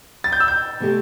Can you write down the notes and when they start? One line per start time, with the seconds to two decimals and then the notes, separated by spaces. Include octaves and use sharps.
0.24 A6
0.33 G6
0.40 E6
0.48 G6
0.80 C3 A3 C4 G4